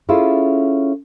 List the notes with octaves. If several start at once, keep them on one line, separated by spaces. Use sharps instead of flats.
C#4 E4 F4 G#4 A4